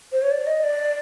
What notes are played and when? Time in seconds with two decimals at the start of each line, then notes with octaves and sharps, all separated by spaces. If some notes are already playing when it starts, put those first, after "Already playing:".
0.12 C5
0.22 C#5
0.31 D5
0.47 D#5
0.64 D5